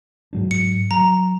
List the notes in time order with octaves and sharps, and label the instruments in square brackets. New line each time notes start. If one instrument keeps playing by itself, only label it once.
[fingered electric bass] G#2 F#3 D4
[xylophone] C#7
[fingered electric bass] F#3 [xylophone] A#5